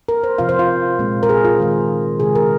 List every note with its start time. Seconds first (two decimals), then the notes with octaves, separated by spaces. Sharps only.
0.09 A#4
0.24 C5
0.38 C3 F3 C4 F4 F5
0.49 C5
0.59 F4
0.99 A#2 G#3 C4
1.23 A#4
1.29 G#4
1.45 F4
1.60 D#3 G#3 F4
2.20 C3 D#3 G#3 G#4
2.35 A#4